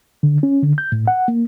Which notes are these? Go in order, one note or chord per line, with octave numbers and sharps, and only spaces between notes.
D3
C#4
D3
G6
A2
F#5
A#3